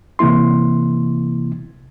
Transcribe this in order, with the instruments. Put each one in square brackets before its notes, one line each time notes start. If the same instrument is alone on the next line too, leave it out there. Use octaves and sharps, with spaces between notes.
[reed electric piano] C3 E3 A#3 E4 C6